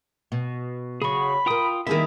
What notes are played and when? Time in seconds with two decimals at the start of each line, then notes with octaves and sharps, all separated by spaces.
0.32 B2
1.02 C#3 F#3 G#4 B5 C#6
1.46 F4 A#4 B4 G5 D#6
1.87 D#3 G3 A#3 B3 E4 G#4 E5